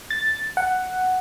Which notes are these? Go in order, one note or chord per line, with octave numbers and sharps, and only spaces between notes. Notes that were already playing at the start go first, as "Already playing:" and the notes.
A6
F#5